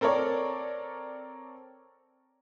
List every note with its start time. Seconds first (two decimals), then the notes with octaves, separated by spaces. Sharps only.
0.01 C4 A4 A#4 C#5 D5